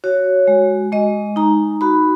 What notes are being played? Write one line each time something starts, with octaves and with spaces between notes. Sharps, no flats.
F#4 C#5
G#3
G#3 D#5
D#4 A#5
F#4 B5